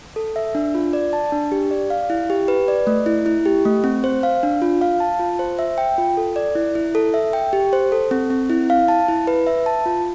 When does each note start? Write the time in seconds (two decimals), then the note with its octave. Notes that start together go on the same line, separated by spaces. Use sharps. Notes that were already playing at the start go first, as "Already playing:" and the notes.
0.16 A4
0.36 E5
0.55 D4
0.75 F4
0.93 D5
1.13 A5
1.32 D4
1.52 G4
1.71 D5
1.90 F5
2.10 E4
2.30 G4
2.48 B4
2.68 D5
2.87 A3
3.06 E4
3.26 E4
3.46 G4
3.65 A3
3.84 C4
4.04 C5
4.23 F5
4.43 D4
4.62 F4
4.81 F5
5.00 A5
5.20 F4
5.39 C5
5.59 E5
5.78 G5
5.98 F4
6.17 A4
6.36 D5
6.55 E4
6.75 E4
6.95 A4
7.14 E5
7.33 G5
7.53 G4
7.73 C5
7.92 A4
8.11 C4
8.30 C4
8.50 E4
8.70 F5
8.88 A5
9.08 E4
9.27 B4
9.47 E5
9.66 A5
9.86 F4